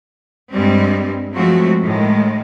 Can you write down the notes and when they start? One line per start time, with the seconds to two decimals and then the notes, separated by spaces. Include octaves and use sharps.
0.51 G2 G3 G#3 C4
1.33 F3 F#3 G#3 A3 C4 F#4
1.82 A2 D#3 G#3